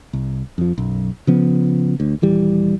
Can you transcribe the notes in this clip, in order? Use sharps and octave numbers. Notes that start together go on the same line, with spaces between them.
C2
F2 F3
B1 F#2
C#3 F3 B3
D2
D#1 E3 G3